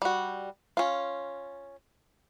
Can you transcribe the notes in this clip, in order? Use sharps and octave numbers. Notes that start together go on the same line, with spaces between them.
G3 F#4
C#4 F4